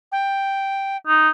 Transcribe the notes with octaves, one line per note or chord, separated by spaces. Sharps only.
G5
D#4